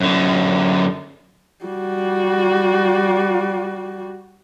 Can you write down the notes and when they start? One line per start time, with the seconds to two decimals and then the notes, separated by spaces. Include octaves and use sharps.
0.01 F#2 D3
1.65 G3 F#4